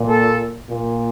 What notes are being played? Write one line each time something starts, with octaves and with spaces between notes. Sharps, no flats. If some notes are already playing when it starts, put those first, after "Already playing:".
Already playing: A#2
A4
A#2